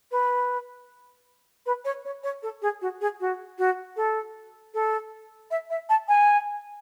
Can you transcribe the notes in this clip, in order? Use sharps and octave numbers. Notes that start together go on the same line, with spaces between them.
B4
B4
C#5
C#5
C#5
A4
G#4
F#4
G#4
F#4
F#4
A4
A4
E5
E5
A5
G#5